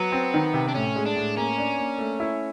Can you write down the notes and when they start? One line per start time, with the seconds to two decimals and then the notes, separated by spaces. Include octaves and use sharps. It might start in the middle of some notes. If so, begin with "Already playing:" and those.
Already playing: F#3 B3
0.12 C4
0.34 D#3
0.54 C3
0.68 D4
0.74 A2 C#4
0.96 G#3
1.06 D4
1.16 A2
1.37 A#3 C#4
1.58 D4
1.78 A#3
1.98 A3
2.20 E4